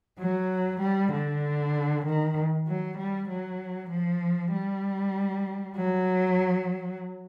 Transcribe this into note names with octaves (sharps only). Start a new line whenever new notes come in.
F#3
G3
D3
D#3
F#3
G3
F#3
F3
G3
F#3